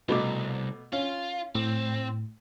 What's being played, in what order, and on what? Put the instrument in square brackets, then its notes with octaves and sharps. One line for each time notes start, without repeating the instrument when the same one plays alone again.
[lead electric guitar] C2 [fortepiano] B2 A3 D6
[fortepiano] C#4 [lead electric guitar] F4
[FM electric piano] A2 [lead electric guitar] C4